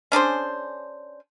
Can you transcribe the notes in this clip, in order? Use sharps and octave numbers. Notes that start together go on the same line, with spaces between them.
C#4 D4 G#4 C5